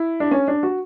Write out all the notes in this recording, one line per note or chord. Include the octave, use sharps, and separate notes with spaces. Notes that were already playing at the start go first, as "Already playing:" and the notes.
Already playing: E4
D4
C#4
D4
F#4